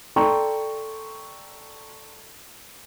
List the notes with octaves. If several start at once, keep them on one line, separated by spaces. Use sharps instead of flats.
A4 D5 G5 A#5 C6 C#6